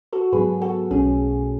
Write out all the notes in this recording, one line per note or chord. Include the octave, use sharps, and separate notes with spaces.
F#4 A4
G#2 F#3 B3 G#4 B4
F#4 A4
B1 B2 A3 C#4 G#4